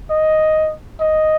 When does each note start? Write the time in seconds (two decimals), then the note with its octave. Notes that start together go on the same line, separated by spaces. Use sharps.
0.10 D#5
1.01 D#5